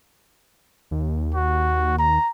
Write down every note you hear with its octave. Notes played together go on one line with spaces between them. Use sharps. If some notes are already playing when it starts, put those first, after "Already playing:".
D#2
F#4
A#5